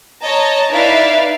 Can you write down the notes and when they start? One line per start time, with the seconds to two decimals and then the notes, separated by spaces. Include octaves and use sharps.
0.24 C#5 D#5 A5 A#5
0.70 D#4 E4 B4 D5 E5 F5